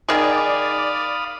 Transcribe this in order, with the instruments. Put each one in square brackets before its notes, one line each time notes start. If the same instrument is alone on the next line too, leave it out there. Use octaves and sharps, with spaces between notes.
[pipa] D#3 G#4 [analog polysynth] D5 [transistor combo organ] F5 B5 D#6